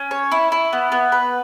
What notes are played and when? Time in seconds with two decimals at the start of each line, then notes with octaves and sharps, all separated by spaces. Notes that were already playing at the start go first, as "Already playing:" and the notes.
Already playing: C#4
0.11 C#5
0.32 E4
0.52 E4
0.73 B3
0.92 B3
1.12 B4